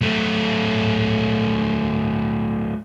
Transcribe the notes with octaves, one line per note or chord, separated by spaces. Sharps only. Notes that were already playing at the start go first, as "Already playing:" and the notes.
F#3 A3